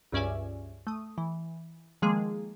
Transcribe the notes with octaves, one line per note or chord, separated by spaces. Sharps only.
C#2 G2 C#4 D5 E5 G#5
A3 D#6
E3
D#3 F3 G#3 A#3 G#4